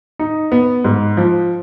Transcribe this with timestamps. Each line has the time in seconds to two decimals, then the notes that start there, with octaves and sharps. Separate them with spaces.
0.19 D#4
0.52 B3
0.84 G#2
1.17 F3